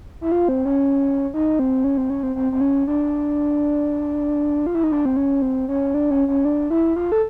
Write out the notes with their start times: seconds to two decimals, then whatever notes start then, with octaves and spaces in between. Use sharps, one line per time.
0.21 E4
0.32 F4
0.49 C4
0.65 C#4
1.34 D#4
1.59 C4
1.84 C#4
1.97 C4
2.10 C#4
2.23 C4
2.36 C4
2.52 C4
2.61 C#4
2.87 D4
4.67 F4
4.75 E4
4.84 D#4
4.92 D4
5.05 C4
5.17 C#4
5.42 C4
5.68 C#4
5.94 D4
6.11 C#4
6.28 C#4
6.45 D4
6.70 E4
6.96 F4
7.12 A4